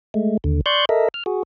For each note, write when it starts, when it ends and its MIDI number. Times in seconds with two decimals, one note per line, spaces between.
0.14 0.37 56
0.14 0.37 57
0.44 0.61 39
0.44 0.61 50
0.66 0.85 74
0.66 0.85 84
0.66 0.85 85
0.66 0.85 90
0.66 0.85 91
0.89 1.08 69
0.89 1.08 70
0.89 1.08 75
0.89 1.08 76
1.14 1.23 89
1.26 1.43 66
1.26 1.43 68